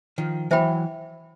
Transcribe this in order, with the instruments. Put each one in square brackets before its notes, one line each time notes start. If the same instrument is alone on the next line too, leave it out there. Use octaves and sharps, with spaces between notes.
[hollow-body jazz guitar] D#3 F3
[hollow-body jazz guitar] E3 F#3 [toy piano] C5 E5 G5 B5